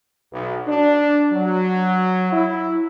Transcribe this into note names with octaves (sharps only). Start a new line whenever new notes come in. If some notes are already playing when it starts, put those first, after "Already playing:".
B1
D4
F#3
E4